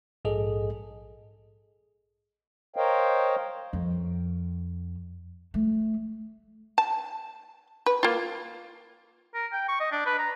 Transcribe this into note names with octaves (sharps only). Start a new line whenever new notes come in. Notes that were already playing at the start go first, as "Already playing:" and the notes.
A#1 G#2 G#4 A4 D#5
A#4 C5 C#5 D#5 F5 G5
F2
A3
A5
B4
A#3 F4
A#4
G5
C#6
D#5
D4
B4
A#5